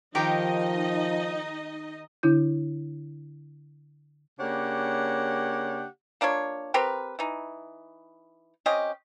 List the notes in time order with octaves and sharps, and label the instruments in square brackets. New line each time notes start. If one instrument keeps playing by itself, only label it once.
[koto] D#3 G4 A#4 [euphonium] F3 [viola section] D#4 D#5
[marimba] D3 D4 E4 G6
[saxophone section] C#3 A#3 D4 G4 C#5 F#5
[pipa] A#3 D4 F4 C#5
C4 G4 A#4 B4
E3 D#4
C4 C#4 G4 D#5